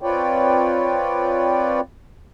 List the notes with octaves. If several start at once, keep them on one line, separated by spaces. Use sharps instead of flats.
C4 F4 B4 C#5 D5 G5